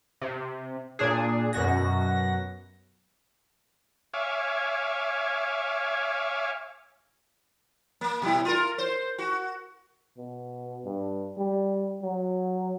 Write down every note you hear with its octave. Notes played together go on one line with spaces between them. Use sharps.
C3
A#2 D4 G#4
F#2 B2 F#4 A#6
C#5 E5 F5 G#5 D6
A#3
B2 G3 E4
F4 A#4
C5
F#4
B2
G2
G3
F#3